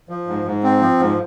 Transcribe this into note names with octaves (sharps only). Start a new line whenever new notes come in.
F3
G#2
G#2
C4
F3
G#2